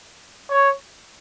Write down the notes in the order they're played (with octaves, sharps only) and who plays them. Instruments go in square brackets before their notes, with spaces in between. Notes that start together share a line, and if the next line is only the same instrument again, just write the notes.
[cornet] C#5